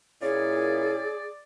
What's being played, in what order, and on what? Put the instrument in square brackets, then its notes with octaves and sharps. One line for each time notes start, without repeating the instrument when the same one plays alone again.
[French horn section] A#2 E4 [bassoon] C#4 [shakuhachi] G#4 [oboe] D5